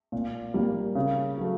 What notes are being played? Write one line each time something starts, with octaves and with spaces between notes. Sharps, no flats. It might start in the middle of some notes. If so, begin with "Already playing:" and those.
A#2
G3 A#3
C#3
F#3 A3